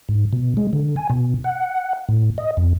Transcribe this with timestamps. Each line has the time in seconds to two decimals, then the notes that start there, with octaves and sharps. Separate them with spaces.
0.09 G#2
0.33 B2
0.57 G#3
0.73 D3
0.96 G#5
1.10 B2
1.44 F#5
2.09 A2
2.38 D#5
2.57 F2